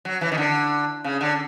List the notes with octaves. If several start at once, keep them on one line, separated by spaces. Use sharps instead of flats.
F#3
E3
D#3
D3
C#3
D3